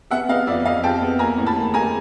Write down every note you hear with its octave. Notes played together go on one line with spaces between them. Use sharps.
B3 E5 F#5
B3 D#5 F5
F2 D5 E5
F2 D#5 F5
F2 G5 A5
B3
A#3 G#5 A#5
A2
A5 B5
A#3
A#3 G#5 A#5